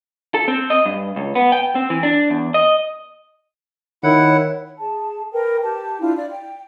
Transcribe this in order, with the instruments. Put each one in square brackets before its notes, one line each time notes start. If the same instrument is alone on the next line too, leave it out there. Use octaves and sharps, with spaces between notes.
[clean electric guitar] A4
C4
D#5
G2
C#2
B3
G5
C4
E3
D4
E2
D#5
[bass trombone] D#3 [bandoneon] E4 F#5 [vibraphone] C#5
[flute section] G#4 A5
A#4 B4 G5
G4 A5
D4 E4 F4
D5
G5